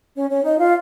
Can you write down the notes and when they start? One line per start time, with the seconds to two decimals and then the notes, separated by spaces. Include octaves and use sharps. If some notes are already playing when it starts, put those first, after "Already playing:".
0.16 C#4 C#5
0.29 C#4 C#5
0.44 D#4 D#5
0.57 F4 F5